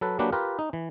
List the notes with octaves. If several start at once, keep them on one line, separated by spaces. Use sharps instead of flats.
F#3 A4 B4
F#3 A#3 D4 G4 B4
F4 G4 A#4 B4
D#4
E3